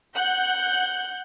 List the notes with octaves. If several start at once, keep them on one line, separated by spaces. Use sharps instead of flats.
F#5 F#6 G6